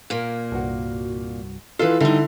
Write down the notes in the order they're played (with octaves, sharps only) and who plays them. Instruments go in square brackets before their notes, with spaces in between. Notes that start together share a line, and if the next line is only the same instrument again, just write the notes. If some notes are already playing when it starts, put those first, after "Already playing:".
[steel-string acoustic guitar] A#2 A#3
[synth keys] C2 G2 F#4
[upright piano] E3 F4 [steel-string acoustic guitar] A4 B4 [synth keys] C6
[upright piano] D3 E4 [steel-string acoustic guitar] G3 D#4